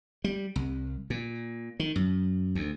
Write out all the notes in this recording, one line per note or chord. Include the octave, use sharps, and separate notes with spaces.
G3
C2
A#2
D#3
F#2
D2